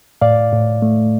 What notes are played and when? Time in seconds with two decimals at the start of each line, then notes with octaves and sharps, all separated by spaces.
0.21 A2 D5 F5
0.52 A2
0.82 A3